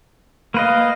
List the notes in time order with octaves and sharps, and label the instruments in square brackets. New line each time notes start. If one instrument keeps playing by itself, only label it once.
[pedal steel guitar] A#3 B4 D#5 [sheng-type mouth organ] F5